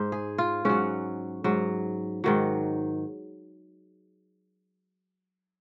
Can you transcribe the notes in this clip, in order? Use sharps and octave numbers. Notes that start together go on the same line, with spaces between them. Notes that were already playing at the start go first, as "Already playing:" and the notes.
Already playing: G#2 C5
G#4
F4
G#2 F#3 C#4
G#2 F#3
G#2 D#3 F#3